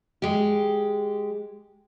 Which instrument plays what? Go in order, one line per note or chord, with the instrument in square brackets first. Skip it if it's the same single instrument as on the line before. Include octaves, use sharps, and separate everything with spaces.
[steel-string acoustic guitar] G#3 G4